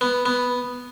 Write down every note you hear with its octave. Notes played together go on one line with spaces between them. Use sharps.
B3
B3